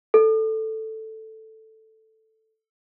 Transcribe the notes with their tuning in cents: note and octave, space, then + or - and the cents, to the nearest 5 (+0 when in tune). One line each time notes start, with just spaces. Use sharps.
A4 +0